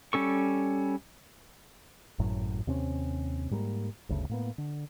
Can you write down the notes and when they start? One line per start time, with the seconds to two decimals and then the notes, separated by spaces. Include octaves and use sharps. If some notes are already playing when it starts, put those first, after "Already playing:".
0.13 G3 C#4 A4 C#6
2.19 G#1 F#2 A2 F#3
2.67 D#2 C3 C4 C#4
3.51 G#2 G3 A3 A#3
4.09 G1 D2 C#3 A3
4.29 A2 A#3 B3
4.58 D3